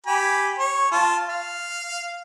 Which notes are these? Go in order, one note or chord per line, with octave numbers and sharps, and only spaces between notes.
G4 G#5 B5
C#5
F4 A5
F5